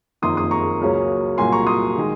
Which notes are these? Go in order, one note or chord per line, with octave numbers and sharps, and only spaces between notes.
F#1 F2 D#3 A#3 C6 D#6
C6 D#6
A#5 C#6
C#2 C#3 F#3 A#3 C#4
C2 A#2 F#3 A#3 G#5 C6
A#5 C#6
C6 D#6
D#3 G#3